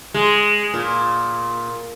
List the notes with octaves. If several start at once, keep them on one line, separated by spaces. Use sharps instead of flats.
G#3
A#2